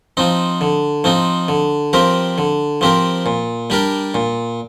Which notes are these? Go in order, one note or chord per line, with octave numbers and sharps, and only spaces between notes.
F3 C4 D#4
D3
F3 C4 D#4
D3
F3 C4 G4 A#4
D3
F3 C4 G4 A#4
A#2
G3 D4 G4 A#4
A#2